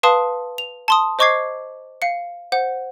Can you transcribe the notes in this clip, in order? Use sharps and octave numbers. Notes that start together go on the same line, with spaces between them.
B4 F5 A5 C6 D#6
F7
A5 C6 D#6
C5 D#5 C#6 D6 G#6 C7
F5 C#7
C5 F#5